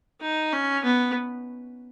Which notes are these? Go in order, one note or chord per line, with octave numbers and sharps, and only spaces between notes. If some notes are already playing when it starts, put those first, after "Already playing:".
D#4
C#4
B3